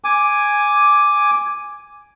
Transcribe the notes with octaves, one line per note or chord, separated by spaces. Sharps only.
G#5 D6